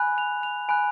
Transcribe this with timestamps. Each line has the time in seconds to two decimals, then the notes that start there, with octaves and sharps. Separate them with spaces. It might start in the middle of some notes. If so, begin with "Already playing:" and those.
Already playing: G#5 B5 F#6
0.18 F7
0.43 F7
0.69 G#5 B5 F#6 D7